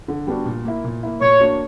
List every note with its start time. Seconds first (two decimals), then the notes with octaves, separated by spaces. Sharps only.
0.08 D3
0.27 G3 B3 D4 F#4
0.46 A#2
0.65 A#3 E4
0.84 A#2
1.03 A#3 E4
1.21 A#2 C#5
1.40 A#3 D4 F#4